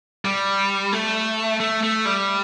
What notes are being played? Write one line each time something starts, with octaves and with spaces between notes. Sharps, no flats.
G3
A3
A3
A3
G3